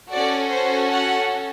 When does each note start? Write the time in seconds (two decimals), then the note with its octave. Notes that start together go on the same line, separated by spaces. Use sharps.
0.11 C#4 F#4 A4 D5
0.51 C5
0.90 F#5